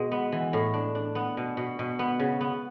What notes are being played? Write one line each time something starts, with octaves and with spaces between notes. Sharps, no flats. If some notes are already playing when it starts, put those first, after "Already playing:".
Already playing: B2 G#3
B3
E3
A2
D4
D4
B3
B2
B2
B2
B3
C#3
B3